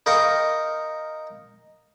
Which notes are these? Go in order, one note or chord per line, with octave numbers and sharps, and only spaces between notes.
D#4 A#4 F5 G5 A#5 C#6